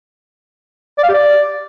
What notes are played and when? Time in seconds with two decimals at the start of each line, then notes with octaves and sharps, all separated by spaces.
0.98 D5
1.04 F5
1.09 G4
1.14 D5